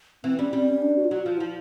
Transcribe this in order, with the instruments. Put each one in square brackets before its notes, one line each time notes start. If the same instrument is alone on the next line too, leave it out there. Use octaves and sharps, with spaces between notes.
[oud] E3 [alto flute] C4
[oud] G3 [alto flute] C#4
[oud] G3 [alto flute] C4
[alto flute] C#4
D4
F#4
F4
[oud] F#3 [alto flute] F#4
[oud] F3 [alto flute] F4
[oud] F3 [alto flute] E4